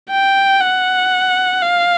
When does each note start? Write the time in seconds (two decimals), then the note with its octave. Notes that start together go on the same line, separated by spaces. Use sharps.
0.11 G5
0.61 F#5
1.62 F5